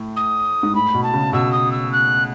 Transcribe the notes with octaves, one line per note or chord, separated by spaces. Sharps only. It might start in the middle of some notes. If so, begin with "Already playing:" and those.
Already playing: A2
D#6
G#2
A2 B5
B2
A5
C#3
B2 E6
D#6
E6
F#6